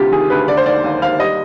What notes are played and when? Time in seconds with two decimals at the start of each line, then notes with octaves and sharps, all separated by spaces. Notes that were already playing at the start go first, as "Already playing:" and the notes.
Already playing: D2 C3 F4 G4
0.11 D#3 G#4
0.30 D2 B4
0.47 D3 D5
0.57 C5
0.65 D#2 D5
0.84 D#2
1.02 D#2 F5
1.20 G3 D#5